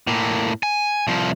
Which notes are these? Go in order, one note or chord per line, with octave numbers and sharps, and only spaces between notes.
A2 A#3
G#5
C2 F3